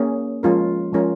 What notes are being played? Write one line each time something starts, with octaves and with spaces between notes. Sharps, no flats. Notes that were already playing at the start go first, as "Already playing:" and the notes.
Already playing: A#3 C#4 G#4
F3 G#3 C#4 F4 A#4
F3 G#3 C#4 F4 A#4